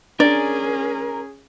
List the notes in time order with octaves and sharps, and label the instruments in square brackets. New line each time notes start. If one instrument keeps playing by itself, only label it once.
[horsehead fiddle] C#4 G#4 [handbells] D4 [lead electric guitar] A#4 [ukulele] D5